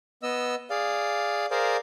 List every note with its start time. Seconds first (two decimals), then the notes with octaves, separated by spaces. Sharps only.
0.23 B3 D#5 E6
0.70 G#4 D5 F5
1.51 G#4 A#4 C5 D5 F5